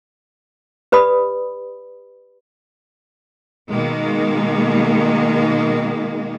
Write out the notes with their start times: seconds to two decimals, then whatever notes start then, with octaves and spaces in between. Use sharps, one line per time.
0.92 G4 B4 D5 B5 D#6
3.69 B2 D#3 G#3 A#3 D#4